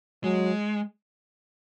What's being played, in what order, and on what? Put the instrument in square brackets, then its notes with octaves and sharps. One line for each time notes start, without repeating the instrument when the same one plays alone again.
[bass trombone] F#3 [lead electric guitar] G#3